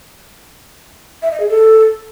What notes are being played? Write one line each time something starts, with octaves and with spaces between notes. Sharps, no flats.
E5
D#5
G#4
A4